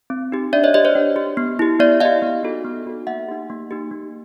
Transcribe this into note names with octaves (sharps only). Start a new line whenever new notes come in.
C4
D#4 G4
D4 D5 E5
C#5 D#5
G4 C#5 D#5
C5 D5
D4
G4
B3
E4 G4
B3 D5 E5
E4 G4 D#5 F5
B3
D#4 F#4 A4
B3
D#4 F#4 A4
A#3 E5 F#5
D#4 G4
A#3
D#4 G4
A#3